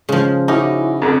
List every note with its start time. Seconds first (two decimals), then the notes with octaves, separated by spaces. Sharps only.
0.09 C#3 F3 G#3
0.48 C#4 D#4 E4 F#4 D6
1.02 F2 D3 A4 A#5